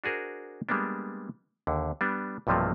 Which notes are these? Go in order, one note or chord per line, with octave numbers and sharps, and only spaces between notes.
D4 F#4 G#4 A#4 C5
G3 G#3 A#3 B3 D4
D#2 D3
G3 B3 D4
B1 G2 C3 F3 A3 A#3